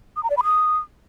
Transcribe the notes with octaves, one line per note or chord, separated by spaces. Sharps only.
D#6
A#5
D5
B5
D#6